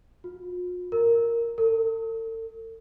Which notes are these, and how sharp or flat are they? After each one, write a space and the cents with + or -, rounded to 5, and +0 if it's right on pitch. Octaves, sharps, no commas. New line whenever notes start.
F4 +45
A#4 -5
A4 +40